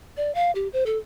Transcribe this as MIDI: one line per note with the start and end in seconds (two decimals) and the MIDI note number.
0.17 0.33 74
0.35 0.51 77
0.55 0.68 67
0.73 0.84 72
0.86 0.98 69